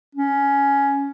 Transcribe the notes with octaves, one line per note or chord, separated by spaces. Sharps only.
C#4